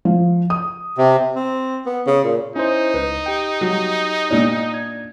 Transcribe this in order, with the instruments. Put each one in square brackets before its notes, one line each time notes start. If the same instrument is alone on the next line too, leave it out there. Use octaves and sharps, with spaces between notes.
[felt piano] F3
D#6
[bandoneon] C3
[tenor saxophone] C4
B3
C#3
A#2
[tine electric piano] C#4 E4 C5 [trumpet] D#4
[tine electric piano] C#2 [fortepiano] B4
[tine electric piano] G4 G5
[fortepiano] F#3
A#2 D4
[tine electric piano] G#6